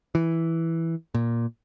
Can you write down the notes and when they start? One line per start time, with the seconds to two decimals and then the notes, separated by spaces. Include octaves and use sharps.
0.15 E3
1.14 A#2